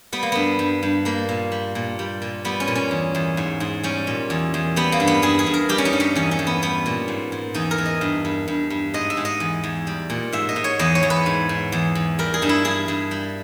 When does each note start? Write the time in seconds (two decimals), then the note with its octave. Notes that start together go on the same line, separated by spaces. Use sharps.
0.12 G3 B3
0.23 A#3
0.32 G2 B3
0.59 G2
0.83 G2
1.05 G3 A#3
1.29 A#2
1.52 G3
1.75 A#2
1.99 G3
2.22 A#2
2.45 G3 B3
2.60 C#4
2.68 A#2
2.75 C#4
2.91 E2
3.15 E2
3.37 G#2
3.60 G#2
3.83 G3 C#4
4.07 A#2
4.30 E2
4.54 E2
4.76 G3 B3
4.92 A#3
5.00 G2
5.07 B3
5.22 G2 G#4
5.39 G#4
5.46 G2
5.54 A#4
5.69 G3 G4
5.78 C#4
5.85 D#4
5.93 G2
6.00 C#4
6.15 E2 C#4
6.31 C#4
6.39 E2
6.47 B3
6.62 G3 B3
6.86 A#2
7.08 G#2
7.32 G#2
7.54 E2 D#4
7.71 A#4
7.78 E2
7.86 D#5
8.01 G2
8.25 G2
8.48 G2
8.70 G2
8.94 G#2 D#5
9.10 E5
9.17 G#2
9.25 D#5
9.40 E2
9.63 E2
9.87 G3
10.10 A#2
10.32 G#2 E5
10.49 D#5
10.56 G#2
10.64 C#5
10.79 E2 D#5
10.95 C#5
11.03 E2
11.10 B4
11.26 G#2
11.49 G#2
11.72 E2
11.95 E2
12.19 G3 A#4
12.34 G#4
12.42 G2 D#4
12.49 E4
12.65 G2 G#4
12.88 G2
13.11 G3